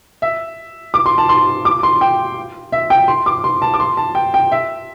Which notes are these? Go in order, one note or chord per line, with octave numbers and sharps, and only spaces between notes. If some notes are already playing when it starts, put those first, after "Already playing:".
E5
D6
C6
A5
C6
D6
C6
G5
E5
G5
C6
D6
C6
A5
D6
C6
A5
G5
G5
E5